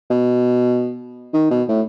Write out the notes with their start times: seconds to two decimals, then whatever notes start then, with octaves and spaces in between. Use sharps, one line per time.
0.10 B2
1.34 D#3
1.51 B2
1.69 A2